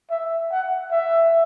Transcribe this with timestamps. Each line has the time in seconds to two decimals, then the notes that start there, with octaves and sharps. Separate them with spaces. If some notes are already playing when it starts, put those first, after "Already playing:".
0.11 E5
0.51 F#5
0.91 E5